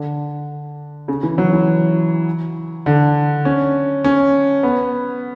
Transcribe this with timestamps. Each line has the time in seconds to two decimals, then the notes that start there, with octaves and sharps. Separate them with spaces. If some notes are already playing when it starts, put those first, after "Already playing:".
Already playing: D3
1.08 C#3
1.23 E3
1.38 F#3
1.53 E3
2.86 D3
3.45 C#4
4.04 C#4
4.63 B3